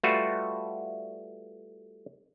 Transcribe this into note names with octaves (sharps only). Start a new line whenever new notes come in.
G3 A3 F4 F#4 A4 B4